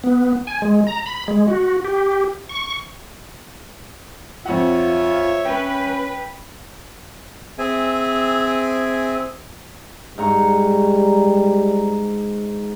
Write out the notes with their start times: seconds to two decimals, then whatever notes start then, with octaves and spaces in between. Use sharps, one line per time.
0.04 B3
0.47 G#5
0.62 G#3
0.87 A#5
1.06 B5
1.28 G#3
1.48 F#4
1.84 G4
2.49 C#6
4.46 F2 F4 C#5 E5 F#5
5.45 C#4 B4 G5
7.59 C4 G#4 E5 G#5
10.18 G#2 G3 A#5 C#6